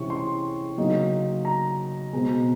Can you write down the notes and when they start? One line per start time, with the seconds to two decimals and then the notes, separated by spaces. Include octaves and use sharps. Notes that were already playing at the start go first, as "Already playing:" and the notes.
Already playing: C3 E3 G#3 C#4 E4 C#6
0.10 C6
0.78 C#3 F#3 A#3 D#4
1.45 A#5
2.13 B2 G#3 C4